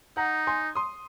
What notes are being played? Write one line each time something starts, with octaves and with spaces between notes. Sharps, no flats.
D#4 F#5 A#5
G#5 C6
C6 D#6